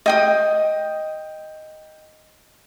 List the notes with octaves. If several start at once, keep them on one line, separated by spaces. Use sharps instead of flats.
D#5 G5 D#6